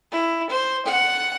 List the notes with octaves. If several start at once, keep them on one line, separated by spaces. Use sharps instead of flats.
E4
C5
F#5